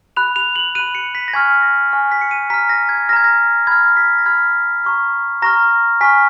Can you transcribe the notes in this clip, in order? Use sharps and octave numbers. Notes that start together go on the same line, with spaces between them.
B5 F#6 F7
F7
F#7
B5 F#6 D#7
C#7
B6
A#6
G#5 C#6 F6 G#6
A#6
G#5 C#6 F6 A#6
B6
C#7
D#7
A#5 F6 B6
A#6
G#6
A#5 F6 G#6 A#6
A#6
B5 F6 G#6
B6
A#6
B5 F6 G#6
A#5 C#6 F6
A#5 C#6 F6 A#6
G#5 C#6 F6 B6